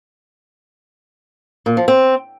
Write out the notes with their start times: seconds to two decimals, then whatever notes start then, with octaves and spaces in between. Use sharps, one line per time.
1.66 A#2
1.77 F3
1.88 C4